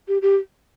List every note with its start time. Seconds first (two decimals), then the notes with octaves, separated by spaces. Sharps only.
0.08 G4
0.22 G4